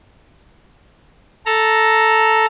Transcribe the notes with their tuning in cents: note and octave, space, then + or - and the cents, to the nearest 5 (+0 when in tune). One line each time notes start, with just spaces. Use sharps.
A4 +0 A#5 +0